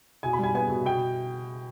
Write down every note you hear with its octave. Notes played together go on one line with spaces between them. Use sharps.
B2 G#5
B5
G3 G#5
B3 G#5
B2
B2 G5